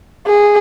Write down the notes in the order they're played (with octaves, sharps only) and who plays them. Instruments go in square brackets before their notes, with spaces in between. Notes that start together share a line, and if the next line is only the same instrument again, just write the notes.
[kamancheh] G#4